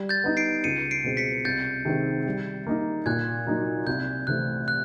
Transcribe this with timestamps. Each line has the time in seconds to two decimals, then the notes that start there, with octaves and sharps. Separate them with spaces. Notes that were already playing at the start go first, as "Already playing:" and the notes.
Already playing: G3
0.09 G6 A6
0.24 B3 D#4
0.37 C7 D7
0.64 C#2 C#7 D#7
0.91 C7 D7
1.04 B2 G#3 C4
1.17 B6 C#7
1.45 C2 G6 A6
1.85 C3 D#3 G#3 C4
2.26 G3
2.67 A#3 D#4
3.06 A#2 F#6 G#6
3.47 F#3 A#3 D#4
3.87 C2 G6
4.27 C3 E3 A3 C4 F#6
4.68 F#6